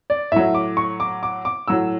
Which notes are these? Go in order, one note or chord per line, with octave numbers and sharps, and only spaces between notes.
D5
A2 F#3 E5
D6
C#6
D6
D6
D6
A2 F#3 E6